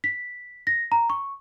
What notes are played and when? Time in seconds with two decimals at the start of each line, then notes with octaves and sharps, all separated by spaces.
0.04 B6
0.67 A#6
0.92 A#5
1.10 C#6